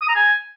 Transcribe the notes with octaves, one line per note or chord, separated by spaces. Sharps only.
D#6
A#5
G#5